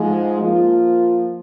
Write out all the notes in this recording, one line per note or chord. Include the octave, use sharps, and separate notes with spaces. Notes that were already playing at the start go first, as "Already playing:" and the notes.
Already playing: G#2 F3 G#3
F3 A#3 F4